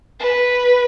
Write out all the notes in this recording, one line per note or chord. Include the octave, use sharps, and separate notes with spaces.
B4